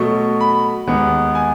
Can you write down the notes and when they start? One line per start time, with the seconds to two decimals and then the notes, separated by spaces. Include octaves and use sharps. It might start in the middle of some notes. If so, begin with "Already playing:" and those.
Already playing: B2 F#3 A3 C#6
0.41 B5
0.87 D#2 D#3 G#3 B3
1.35 G#5